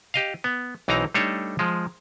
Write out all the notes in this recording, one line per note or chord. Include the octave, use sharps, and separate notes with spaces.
G4 D#5 F5
B3
B1 E3 C4 D#4 A#5
G3 A3 D4 D#4 A4 C#5
F3 G#3